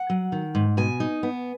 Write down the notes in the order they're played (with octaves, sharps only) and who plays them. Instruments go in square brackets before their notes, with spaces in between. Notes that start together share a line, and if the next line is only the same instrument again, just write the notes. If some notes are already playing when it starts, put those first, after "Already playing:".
Already playing: [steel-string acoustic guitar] F#5
F#3
D#3
G#2
B2 G#5
D#4
B3